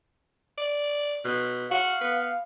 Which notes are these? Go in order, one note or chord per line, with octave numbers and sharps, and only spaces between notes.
D5
B2
F#4 F5
B3